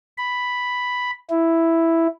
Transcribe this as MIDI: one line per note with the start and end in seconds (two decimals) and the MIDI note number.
0.18 1.11 83
1.30 2.07 64